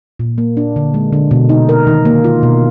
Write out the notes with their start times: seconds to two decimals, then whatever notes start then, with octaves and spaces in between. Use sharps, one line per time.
0.20 A#2
0.38 A#3
0.57 D4
0.76 D3
0.94 G#3
1.13 D3
1.31 B2
1.49 D#4
1.69 A#4
1.87 D#3
2.05 A#3
2.24 F4
2.43 B2